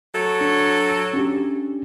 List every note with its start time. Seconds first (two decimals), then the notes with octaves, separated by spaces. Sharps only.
0.15 F#3 A4 C#5
0.41 D4
1.14 C#4 D4 G4